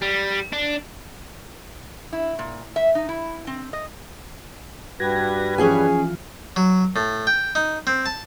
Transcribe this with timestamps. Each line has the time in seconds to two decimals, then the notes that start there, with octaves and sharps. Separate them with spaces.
0.02 G3
0.53 D4
2.13 E4
2.39 A#2
2.76 E5
2.95 D#4
3.09 E4
3.47 C4
3.73 D#5
5.00 G2 G3 F#4 B4 G#6 A#6
5.58 E3 F3 C#4 F4 G#4 G#5
6.56 F#3
6.96 A2
7.27 G5
7.55 D#4
7.87 C4
8.06 A5